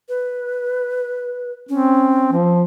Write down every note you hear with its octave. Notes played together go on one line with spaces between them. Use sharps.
B4
C4 C#4
F3